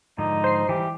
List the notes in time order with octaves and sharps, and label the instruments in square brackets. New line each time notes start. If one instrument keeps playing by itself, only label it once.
[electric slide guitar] G#2 D3 F3 [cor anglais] D#4
[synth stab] C5 C7
[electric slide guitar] E3 G3 [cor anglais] G4